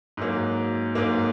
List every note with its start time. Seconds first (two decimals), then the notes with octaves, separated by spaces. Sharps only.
0.17 G#2 F#3 A#3
0.95 G#2 F#3 A#3